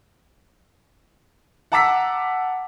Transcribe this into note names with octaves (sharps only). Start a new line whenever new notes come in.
F#5 A5 A#5 D6 E6 B6